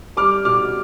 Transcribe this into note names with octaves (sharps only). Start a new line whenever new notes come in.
G3 D6 F6
B2 D6 F6